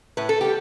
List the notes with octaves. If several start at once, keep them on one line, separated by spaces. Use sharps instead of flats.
A2 B4
A4
G3 B3 G4